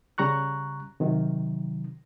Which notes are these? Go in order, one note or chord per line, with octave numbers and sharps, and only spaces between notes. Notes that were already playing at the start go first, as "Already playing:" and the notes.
C#3 G3 A#5 C#6 F#6
C3 D#3 F#3